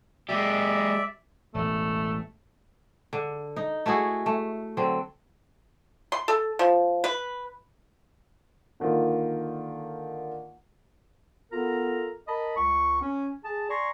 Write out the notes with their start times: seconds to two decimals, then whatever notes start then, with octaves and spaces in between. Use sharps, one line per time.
0.29 G#3 G4 D5 E5
1.54 E1 A1 A3
3.13 D3
3.56 D#4
3.86 A3 E4 F#4 G#4
4.26 A3
4.77 D3 F#3 C4
6.12 C6
6.28 A4
6.59 F3
7.04 B4
8.80 D3 D#3 A#3 F4
11.52 B3 F4 A4 A#4 A#5
12.27 A#4 D#5 A5 B5
12.56 C#2 C#6
13.01 C#4
13.44 G#4 A5
13.69 D5 G#5 A#5 C6 C#6